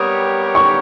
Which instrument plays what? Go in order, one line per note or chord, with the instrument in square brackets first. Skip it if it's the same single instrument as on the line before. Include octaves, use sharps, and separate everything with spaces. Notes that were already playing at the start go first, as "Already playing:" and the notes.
Already playing: [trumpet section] G3 B3 G4 A#4 C#5 [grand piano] D#6
[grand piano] C#6